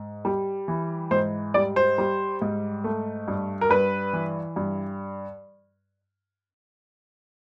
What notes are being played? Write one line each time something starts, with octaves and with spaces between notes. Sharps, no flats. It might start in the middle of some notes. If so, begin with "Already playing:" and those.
Already playing: G#2
G3
E3
G#2 C5
G3 D5
C5
G3
G#2
A3
G2
A#4
G2 B4
E3
G2